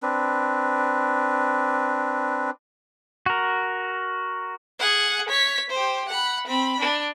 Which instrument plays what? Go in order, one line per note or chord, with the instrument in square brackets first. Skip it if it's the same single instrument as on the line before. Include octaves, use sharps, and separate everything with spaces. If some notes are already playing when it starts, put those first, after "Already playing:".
[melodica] C4 D4 B4
[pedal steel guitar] F#4 A#4
[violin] G#4 F#5
C#5 B6
G4 C5
F#5 B5
C4 B5
D4